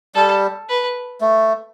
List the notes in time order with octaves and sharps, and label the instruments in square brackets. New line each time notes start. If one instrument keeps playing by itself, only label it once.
[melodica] G3 [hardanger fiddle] A4
[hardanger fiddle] B4
[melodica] A3